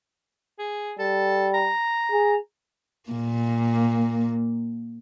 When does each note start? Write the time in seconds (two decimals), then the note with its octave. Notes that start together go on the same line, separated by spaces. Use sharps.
0.59 G#4
0.99 G3 A4
1.54 A#5
2.12 G#4
3.10 A#2 A#3